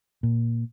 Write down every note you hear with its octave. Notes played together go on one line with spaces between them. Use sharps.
A#2